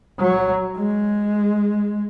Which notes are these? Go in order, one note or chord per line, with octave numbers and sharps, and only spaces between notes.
F#3
G#3